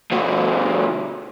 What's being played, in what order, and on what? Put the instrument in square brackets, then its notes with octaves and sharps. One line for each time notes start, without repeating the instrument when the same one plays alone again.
[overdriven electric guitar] D2 B2